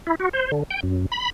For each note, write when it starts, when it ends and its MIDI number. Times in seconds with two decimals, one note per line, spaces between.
0.07 0.15 64
0.20 0.29 66
0.33 0.51 72
0.52 0.63 50
0.70 0.80 79
0.83 1.06 42
1.12 1.30 83